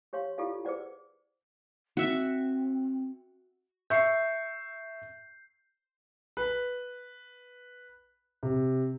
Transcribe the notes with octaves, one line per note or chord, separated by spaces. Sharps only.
G4 C#5 F5 C6
E4 F4 G4 A4 D5 F5
G#4 B4 C5 D5 F#5
C4 F#4 E5 C#6
E5 C#6 G6 C7
B4
C3